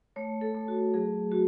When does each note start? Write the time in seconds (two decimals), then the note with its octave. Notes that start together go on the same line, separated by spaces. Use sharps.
0.16 A3 C#5
0.41 A4
0.55 A3
0.68 F#4
0.94 F#3 G#4
1.32 F#4